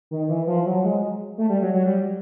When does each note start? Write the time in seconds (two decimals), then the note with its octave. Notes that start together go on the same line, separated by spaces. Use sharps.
0.11 D#3
0.29 E3
0.47 F3
0.66 F#3
0.84 G#3
1.38 A3
1.49 G3
1.62 F#3
1.74 F#3
1.86 G3